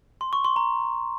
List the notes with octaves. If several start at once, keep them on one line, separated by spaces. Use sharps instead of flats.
C6
C#6
C6
A#5